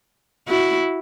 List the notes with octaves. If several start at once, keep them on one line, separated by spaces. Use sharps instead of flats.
E4 F#4